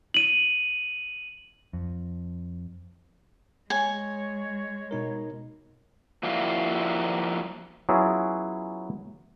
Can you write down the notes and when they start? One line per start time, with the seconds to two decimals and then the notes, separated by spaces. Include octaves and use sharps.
0.14 D#7 F#7
1.73 F2
3.70 G#3 C#5 G#5
4.91 B2 D#4 A#4
6.23 F3 G3 A#3 E4 F#4 F5
7.89 F#3 B3 C#4 E4 F4 G#4